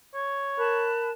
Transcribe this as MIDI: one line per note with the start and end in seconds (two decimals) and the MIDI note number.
0.14 0.92 73
0.59 1.14 70
0.59 1.10 81
0.59 1.10 83
0.59 1.10 90